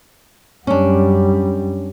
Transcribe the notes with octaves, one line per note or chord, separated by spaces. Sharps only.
F#2 G3 C#4 D4